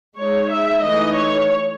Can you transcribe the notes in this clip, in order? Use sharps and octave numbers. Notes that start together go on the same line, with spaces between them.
G#3 D#4 C#5
E5
E3 A3 D#4 D#5
C#5